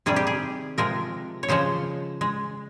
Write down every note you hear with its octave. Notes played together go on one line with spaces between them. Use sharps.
C3 D#3 G3 G#4
G4
G#4
C3 F3 G#3 A#4
C#5
C#3 F3 G#3 C5
G#3